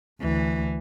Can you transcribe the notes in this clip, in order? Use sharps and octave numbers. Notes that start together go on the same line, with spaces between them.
D2 E3